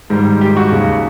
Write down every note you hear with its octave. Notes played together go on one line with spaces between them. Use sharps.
G#2 D#3 G3
G4
F#4
D#2 C#3 F#3